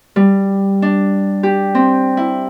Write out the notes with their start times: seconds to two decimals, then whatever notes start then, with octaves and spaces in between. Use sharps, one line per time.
0.16 G3
0.82 D4
1.43 G4
1.75 C4
2.17 E4